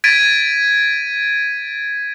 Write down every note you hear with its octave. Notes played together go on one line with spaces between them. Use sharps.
G#6 A6 B6 D7 D#7